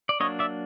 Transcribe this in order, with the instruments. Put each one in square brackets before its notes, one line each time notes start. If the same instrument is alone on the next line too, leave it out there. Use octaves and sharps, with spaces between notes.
[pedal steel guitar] D5
F#3 A#3 D4 C#5 D#5
D5 E5